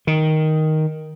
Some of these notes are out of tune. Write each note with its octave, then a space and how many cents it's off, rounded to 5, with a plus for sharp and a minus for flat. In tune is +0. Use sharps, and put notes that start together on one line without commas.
D#3 +5